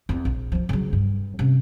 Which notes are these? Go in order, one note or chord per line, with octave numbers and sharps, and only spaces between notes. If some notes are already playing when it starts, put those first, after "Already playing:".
E2 C4
A#1
G2 F3
C#3 F#3
G2
C3 C#4